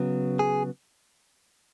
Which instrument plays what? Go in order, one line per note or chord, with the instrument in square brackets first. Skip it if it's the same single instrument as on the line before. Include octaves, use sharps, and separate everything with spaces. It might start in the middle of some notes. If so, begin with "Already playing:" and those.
Already playing: [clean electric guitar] C#3 F#3 B3
G#4